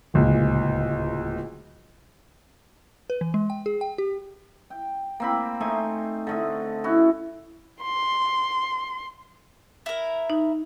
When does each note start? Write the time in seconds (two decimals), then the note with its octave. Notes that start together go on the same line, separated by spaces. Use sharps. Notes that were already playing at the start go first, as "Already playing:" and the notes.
0.14 D1 C#2 A#2
3.10 B4
3.21 E3
3.34 G#3
3.50 G5
3.66 G#4
3.81 G5
3.98 G4
4.70 G5
5.20 A#3 C4 B5
5.60 A3 D#4 C5 G#5
6.27 D3 A3 D#5
6.84 C#4 E4 F#4
7.82 C6
9.86 E4 A#4
10.30 D#4